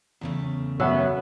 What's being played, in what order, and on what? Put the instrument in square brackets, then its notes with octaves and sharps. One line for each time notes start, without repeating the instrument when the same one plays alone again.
[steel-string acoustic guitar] E2 C#3 A3
[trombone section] F#2 B3 [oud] F#3 [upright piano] E5 F#5 E6